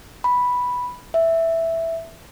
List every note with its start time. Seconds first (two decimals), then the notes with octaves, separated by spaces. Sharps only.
0.24 B5
1.14 E5